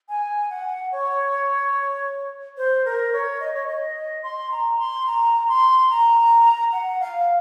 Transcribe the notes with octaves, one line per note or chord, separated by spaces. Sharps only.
G#5
F#5
C#5
C5
A#4
C#5
D#5
C#5
D#5
C6
A#5
C6
A#5
C6
A#5
F#5
F5